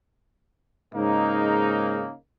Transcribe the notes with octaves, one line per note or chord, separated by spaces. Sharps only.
G#2 C#3 A#3 D#4